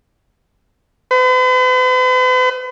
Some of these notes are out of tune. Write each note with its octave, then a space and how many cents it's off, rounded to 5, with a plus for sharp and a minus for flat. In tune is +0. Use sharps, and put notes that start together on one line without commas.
B4 +45